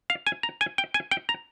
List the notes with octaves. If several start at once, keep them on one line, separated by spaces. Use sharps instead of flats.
F5
G#5
A#5
G#5
G5
G#5
G5
A#5